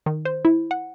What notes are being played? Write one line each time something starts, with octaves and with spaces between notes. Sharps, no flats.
D#3
C5
E4
F#5